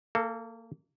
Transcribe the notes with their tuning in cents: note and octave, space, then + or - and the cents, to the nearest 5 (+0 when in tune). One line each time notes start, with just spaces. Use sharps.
A#3 -25 A4 +5